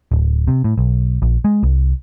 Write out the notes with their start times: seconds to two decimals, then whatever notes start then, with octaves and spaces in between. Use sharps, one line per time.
0.12 D1
0.48 C3
0.64 A2
0.78 B1
1.22 A#1
1.44 G#3
1.63 C2